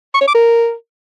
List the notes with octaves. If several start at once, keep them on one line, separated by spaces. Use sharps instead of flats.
C#6
C#5
D6
A#4